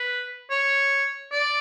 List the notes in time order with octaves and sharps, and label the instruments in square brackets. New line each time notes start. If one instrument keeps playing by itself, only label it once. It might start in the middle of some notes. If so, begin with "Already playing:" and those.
Already playing: [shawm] B4
C#5
D5